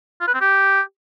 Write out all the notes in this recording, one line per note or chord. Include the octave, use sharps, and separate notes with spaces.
F4
B4
C4
G4